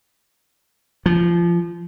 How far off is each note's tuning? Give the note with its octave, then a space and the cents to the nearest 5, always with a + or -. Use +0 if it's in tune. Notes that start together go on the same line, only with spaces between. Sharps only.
F3 -20